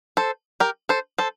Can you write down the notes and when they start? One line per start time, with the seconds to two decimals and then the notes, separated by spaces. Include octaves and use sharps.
0.17 A4 C5
0.60 G4 A#4
0.89 A4 C5
1.18 A4 C5